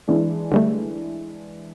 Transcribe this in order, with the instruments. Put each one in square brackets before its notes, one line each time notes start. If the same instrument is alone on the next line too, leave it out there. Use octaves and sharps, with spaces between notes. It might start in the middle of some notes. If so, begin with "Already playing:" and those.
[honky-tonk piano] E3 G#3 D4
[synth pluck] D3 G3 A3